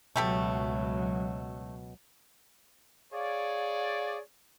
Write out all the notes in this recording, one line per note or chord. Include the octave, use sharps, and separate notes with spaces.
C#2 B2 F#3 A3 G4 A4
G#4 C#5 D5 F5